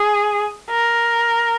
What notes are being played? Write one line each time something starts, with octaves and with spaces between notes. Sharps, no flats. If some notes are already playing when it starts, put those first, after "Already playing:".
Already playing: G#4
A#4